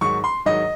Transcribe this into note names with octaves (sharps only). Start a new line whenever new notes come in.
G#2 D#3 F#3 C#6
C6
G#2 D#3 F#3 D#5